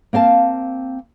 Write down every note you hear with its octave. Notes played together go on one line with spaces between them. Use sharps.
A#3 C4 F5 A5